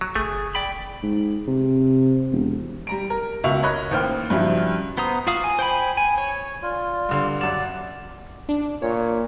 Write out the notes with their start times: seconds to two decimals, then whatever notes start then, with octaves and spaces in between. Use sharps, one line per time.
0.01 F#3
0.15 F#1 A3 G#4
0.55 D5 G5 B5
1.03 G#2
1.48 C3
2.32 E1
2.87 G3 A#5 D7
3.10 A#4
3.44 C#2 B2 E5 C#6 F7
3.62 A#4 C#5 D#5 B5 F#6
3.91 A1 D#3 A#3 C5 G5 F6
4.30 G2 C#3 F3 F#3 E4
4.98 B3 C5 A#5 D#6
5.27 F4 F#4 F5 D#6
5.44 G#5
5.59 C5 G5 G#5 B5
5.97 G#5
6.18 C#5
6.62 F4 D5
7.09 G2 D3 C6
7.41 F#2 D5 F#5 E7
8.49 D4
8.82 A#2 C#5